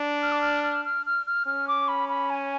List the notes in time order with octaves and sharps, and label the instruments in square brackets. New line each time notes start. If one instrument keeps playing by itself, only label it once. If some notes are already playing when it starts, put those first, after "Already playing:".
Already playing: [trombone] D4
[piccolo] F6
D6
F6
F6
F6
F6
F6
[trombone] C#4 [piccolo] F6
[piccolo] D6
B5
B5
G#5